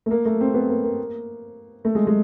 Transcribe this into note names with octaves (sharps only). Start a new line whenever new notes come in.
A3
A#3
A3
C4
B3
A#3
A#3
A3
G#3
G#3